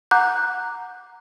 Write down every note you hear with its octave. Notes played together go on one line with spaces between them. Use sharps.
F#5 A#5 D6 F#6 G6